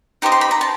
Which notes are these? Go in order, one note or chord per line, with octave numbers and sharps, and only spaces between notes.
D#4 G4 C5 D#5
C6
B5
A#5
A5